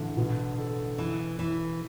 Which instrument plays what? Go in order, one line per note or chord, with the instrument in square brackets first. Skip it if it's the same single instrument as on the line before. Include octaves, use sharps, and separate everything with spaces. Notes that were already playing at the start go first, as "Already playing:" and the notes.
Already playing: [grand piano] A1 [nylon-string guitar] D3
[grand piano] B2
A4
[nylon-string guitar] E3 [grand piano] E4
[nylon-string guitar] E3 [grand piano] E4